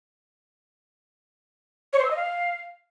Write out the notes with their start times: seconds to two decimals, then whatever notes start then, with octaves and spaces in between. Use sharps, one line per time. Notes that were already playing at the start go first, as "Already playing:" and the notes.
1.93 C#5
1.99 C5
2.05 E6
2.11 D#5
2.16 F5